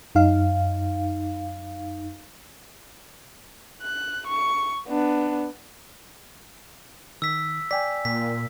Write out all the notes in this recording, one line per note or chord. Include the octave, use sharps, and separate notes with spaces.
F#2 D#4 F5
F#6
C#6
B3 D4
D#3 E6 B6
D5 G5 G#5 B6
A#2 B6